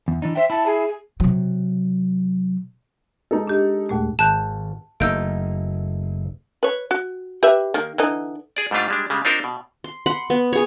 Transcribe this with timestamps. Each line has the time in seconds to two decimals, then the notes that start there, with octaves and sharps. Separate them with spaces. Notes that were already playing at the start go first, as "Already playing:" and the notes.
0.08 E2
0.22 E3 D4 D#4
0.35 C5 E5 G5
0.50 E4 A5
0.66 G#4
1.20 C3 F#3
3.31 G#3 D#4 A4
3.47 D4 G4 D#5
3.89 D#2 A#2 G#3 A3
4.19 G#1 A5 F#6 G6
5.00 F#1 A3 A#3 D#4 E6 G6 D7
6.63 B4 C#5
6.91 F#4
7.43 G4 B4 E5
7.74 D#3 A#3
7.98 D3 E3 D#4
8.57 G#4 D5
8.71 G#2 G3 A3 D4 F4
8.88 G3 G#3 D4
9.10 C#3 G3 G#3
9.25 C4 D4 D#4 F4 A#4 C5
9.44 B2
9.84 C6
10.06 F#5 B5 C6
10.30 B3
10.53 G#4 C#5